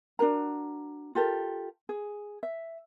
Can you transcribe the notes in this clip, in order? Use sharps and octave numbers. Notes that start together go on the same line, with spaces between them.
D4 F#4 A#4 A#5
F4 G4 A4 A#4
G#4
E5